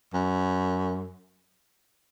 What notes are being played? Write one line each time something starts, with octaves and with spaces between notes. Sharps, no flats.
F#2